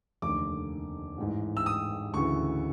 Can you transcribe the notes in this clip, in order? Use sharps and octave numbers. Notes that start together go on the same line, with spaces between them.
F1 D#2 D3 D6
A1 G#2 E3
E6
D#6
D2 C#3 E3 C#6